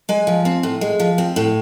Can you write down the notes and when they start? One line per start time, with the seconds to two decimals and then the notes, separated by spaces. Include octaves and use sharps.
0.09 G#3 G#5
0.27 F3
0.45 C4
0.63 A2
0.81 G#3
1.00 F3
1.18 C4
1.36 A2